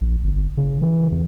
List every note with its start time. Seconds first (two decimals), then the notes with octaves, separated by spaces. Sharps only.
0.01 A#1
0.23 G1
0.57 C#3
0.81 E3
1.12 F2